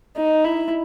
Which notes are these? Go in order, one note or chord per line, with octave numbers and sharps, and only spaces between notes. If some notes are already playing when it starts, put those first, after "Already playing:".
D#4
E4